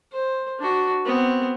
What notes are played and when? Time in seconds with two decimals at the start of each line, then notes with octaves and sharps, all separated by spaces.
0.12 C5
0.59 D4 F#4
1.05 B3 C4